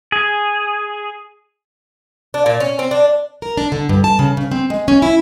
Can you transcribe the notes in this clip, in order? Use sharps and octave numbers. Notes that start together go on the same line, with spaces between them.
G#4
D4
A#2
C#4
C4
D4
A#4
D4
D3
G2
A5
C#3
C#3
C4
G#3
C#4
E4